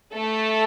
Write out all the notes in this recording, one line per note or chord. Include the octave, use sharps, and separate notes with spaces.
A3 A4